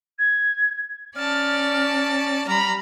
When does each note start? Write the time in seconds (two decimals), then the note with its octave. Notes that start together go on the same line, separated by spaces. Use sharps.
0.18 G#6
1.16 C#4 D5 A5 F6
2.47 G3 A#5 B5 F6